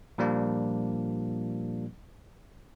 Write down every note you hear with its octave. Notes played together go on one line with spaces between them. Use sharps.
A#2 F3 G3 A#3 D4